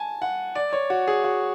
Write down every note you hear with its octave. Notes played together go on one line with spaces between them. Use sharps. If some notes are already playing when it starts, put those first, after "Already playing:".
Already playing: G#5 A5
F#5
D5
C#5
F#4
G#4
F#4